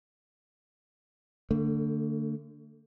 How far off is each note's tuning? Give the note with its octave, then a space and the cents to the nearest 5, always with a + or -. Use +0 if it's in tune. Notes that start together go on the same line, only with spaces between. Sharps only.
D3 +0 A3 +40